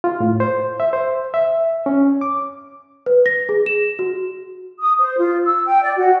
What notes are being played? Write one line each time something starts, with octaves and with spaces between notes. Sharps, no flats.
F4
A2
C5
E5
C5
E5
C#4
D6
B4
A#6
G#4
E7
F#4
D#6
C5
F4
E6
G5
D5
F#4